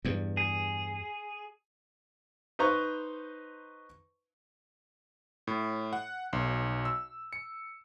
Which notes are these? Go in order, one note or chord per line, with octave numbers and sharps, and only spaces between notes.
E2 G2
G#4
D#4 B4 C5 A#5 C#6
A2
F#5
B1
E6
C#7